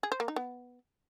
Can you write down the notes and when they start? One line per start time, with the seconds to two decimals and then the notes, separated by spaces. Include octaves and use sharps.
0.03 G#4
0.12 C5
0.20 A#3
0.28 D#4
0.36 B3